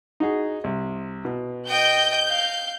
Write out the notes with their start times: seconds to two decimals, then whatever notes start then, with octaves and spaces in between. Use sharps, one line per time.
0.20 D#4 F#4 G#4
0.64 C2
1.25 B2
1.68 D#5 G5 G6
2.28 F5